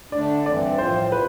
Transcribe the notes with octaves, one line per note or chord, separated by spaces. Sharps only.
D3 A3 D4 D5
G2 E3 A3 C4 D5
A2 F3 C4 F4 C5
C3 B4